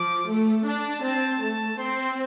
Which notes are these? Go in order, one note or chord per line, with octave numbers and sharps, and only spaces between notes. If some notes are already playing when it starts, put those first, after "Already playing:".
Already playing: F3 D6
A3
D4 A5
C4 A5
A3 A5
C4 C6